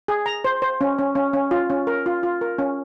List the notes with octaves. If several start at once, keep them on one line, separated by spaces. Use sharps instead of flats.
G#4
A#5
C5
C5
C#4
C#4
C#4
C#4
F4
C#4
A#4
F4
F4
A#4
C#4